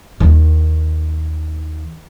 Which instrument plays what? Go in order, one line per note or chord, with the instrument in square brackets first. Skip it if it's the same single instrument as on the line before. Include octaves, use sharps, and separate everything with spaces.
[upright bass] D#2 D#3